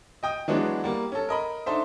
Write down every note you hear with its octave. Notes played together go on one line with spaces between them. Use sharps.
D#5 G5 D#6
E3 F#3 G#3 B3 D4 F#4
G3 A#3
C#4 A4
A#4 D#5 B5
D4 D#4 A4 C5 E5